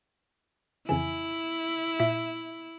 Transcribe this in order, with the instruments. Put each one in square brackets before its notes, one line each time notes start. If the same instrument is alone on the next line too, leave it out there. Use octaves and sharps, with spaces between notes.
[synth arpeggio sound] F2 C#3 E3 [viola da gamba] E4 [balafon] G#5
[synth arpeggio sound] A#2 [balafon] E5